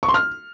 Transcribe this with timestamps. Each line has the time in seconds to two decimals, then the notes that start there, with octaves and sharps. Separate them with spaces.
0.03 C#6
0.09 C6
0.14 F6